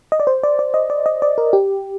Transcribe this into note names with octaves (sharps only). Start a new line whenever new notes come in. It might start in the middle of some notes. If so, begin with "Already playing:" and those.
D#5
D5
C5
D5
D5
D#5
D5
D#5
D5
A#4
G4